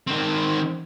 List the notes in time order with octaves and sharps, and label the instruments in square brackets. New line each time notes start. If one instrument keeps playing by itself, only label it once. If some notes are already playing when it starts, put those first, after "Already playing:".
[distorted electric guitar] D#3 C4